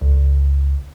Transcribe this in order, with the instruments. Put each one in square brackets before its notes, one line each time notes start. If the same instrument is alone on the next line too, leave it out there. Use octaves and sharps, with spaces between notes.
[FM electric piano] C#2